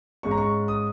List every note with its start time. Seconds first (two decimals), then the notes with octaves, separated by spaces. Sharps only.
0.23 G#2 G#3 C#4 C#6
0.31 A#5
0.38 C#6
0.68 D#6